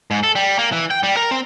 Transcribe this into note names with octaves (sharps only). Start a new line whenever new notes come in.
G#2
A4
G3
A#3
E3
G5
G3
A#4
C4